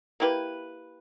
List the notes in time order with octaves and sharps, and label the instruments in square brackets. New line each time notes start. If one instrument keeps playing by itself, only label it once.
[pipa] A#3 E4 G4 B4